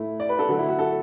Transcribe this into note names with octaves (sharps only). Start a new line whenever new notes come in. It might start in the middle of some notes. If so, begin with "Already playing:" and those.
Already playing: A2 A3 E4
D5
B4
A4
D3 F#3 A3 F#4
E4
F#4
A4